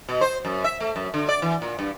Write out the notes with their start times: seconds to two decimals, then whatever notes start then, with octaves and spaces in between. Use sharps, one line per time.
0.09 B2
0.21 C5
0.45 F#2
0.64 E5
0.80 A3
0.96 F#2
1.14 D3
1.29 D5
1.42 E3
1.62 A#2
1.79 G2